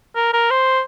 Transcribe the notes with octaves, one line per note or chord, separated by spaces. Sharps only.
A#4
A#4
C5